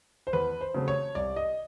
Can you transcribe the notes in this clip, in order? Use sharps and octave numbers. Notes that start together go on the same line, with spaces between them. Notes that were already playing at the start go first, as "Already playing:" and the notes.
C5
E2 B4
C5
C#3 F#3 A3 C4
C#5
C2 D5
D#5